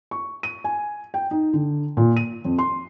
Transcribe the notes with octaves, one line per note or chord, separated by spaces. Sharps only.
C#6
D#7
G#5
G5
D#4
D3
A#2
D#7
F2
C6